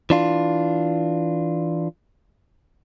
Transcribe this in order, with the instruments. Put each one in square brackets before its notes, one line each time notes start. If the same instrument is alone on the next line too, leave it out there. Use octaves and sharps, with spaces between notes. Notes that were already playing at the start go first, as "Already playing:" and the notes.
[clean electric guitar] E3 D4 F4